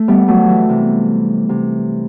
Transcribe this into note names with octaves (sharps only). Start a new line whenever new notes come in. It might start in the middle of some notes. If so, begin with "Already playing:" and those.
Already playing: A3
G3 B3
F#3 A3
E3 G3
C3 E3
C3